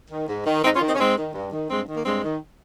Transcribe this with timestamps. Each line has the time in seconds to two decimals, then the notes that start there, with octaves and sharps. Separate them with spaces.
0.10 D#3
0.29 G#2
0.46 D#3
0.63 G#2 C4 D#4
0.76 C#4 F4
0.81 D#3
0.88 C4 D#4
0.95 C#4
0.99 G#2 G#3 C4
1.17 D#3
1.34 G2
1.52 D#3
1.69 G2 G#3 C4
1.88 D#3
1.96 A#3
2.05 G2 G#3 C4
2.23 D#3